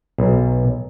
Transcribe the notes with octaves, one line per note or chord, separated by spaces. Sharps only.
B1